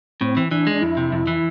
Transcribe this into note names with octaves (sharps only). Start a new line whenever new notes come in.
A2 C4
E3
E3 D4
G#3
D4
F2 E4
C3
F2
E3